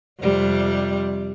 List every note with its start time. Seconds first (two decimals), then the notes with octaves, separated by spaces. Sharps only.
0.20 F2 C3 G3